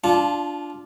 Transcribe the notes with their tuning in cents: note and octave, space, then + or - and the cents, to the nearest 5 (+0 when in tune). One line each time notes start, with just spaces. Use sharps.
D4 +0 F4 +0 A5 -25